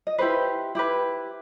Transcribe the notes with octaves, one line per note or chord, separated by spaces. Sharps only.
D#5
E4 G4 B4 C5
E4 G4 B4